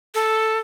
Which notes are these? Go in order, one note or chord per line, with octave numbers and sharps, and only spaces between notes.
A4